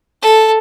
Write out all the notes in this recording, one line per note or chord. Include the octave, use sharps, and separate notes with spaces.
A4